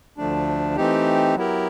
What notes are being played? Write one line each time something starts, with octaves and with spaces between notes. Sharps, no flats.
D2 D3 F3 A3 D4
E3 A3 C4 D#4 G4
F#3 B3 E4 G4 A#4